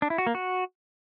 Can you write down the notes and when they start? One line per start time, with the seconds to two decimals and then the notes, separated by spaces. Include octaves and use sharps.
0.02 D4
0.10 E4
0.18 F#4
0.27 A#3
0.35 F#4